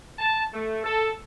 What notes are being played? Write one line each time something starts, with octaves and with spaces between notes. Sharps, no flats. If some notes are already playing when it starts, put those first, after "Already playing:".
A5
A3
A4